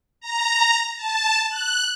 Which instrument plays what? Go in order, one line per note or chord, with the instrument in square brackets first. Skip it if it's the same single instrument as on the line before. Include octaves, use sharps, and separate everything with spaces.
[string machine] A#5
A5
F#6